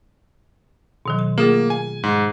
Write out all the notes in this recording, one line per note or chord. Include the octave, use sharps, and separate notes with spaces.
B2 D#3 F#3
C6
A3 A#3 F4 G#4
G#5
G#2